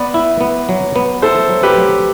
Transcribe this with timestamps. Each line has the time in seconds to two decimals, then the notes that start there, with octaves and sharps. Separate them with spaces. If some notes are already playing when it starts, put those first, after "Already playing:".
Already playing: B3 B4 D5
0.14 E4
0.41 B3
0.69 F#3
0.96 B3
1.22 E4 A4 C5
1.49 F#3
1.63 G4 B4
1.77 F#3